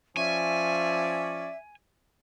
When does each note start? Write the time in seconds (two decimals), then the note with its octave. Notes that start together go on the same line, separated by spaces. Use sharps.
0.17 F3 C#4 D5 E5 G#5